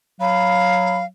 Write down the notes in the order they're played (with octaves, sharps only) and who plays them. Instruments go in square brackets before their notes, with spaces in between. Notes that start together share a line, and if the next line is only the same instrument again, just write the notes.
[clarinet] F#3 [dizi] F5 [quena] B5